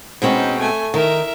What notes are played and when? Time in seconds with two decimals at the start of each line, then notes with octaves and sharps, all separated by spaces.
0.22 B2 G#3 C4 C#4 D#4
0.59 A3 G#5
0.94 D#3 A#4 E5